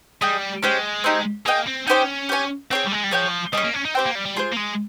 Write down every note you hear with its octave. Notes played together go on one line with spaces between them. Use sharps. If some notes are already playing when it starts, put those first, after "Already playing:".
G3 G#4 D#5 G5
G#3 C#4 G4 C5 G5
C4 D#4 G4
A#3 G#4 D#5 G5
C4
C#4 D#4 G4 C5 G5
G4 C#5 G#5
C4 G#4 C#5 G5
G3
G#3
G3
F3 G#4 C#5 G5
G3 C#4 G#4 D#5
A#3
C#4
D#4
C4 G4 C5 G5
A#3
G3
G3
F4 G#4 C5
A#3
G#3